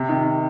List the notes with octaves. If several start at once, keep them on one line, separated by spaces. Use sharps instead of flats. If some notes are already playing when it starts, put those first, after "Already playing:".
Already playing: C3
D#3